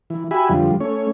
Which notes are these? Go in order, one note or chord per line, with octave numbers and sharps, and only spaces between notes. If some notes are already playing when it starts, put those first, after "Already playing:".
E3
F#4 G4 E5 G#5 B5
F2 D3 F3 G3
A3 C#4 C#5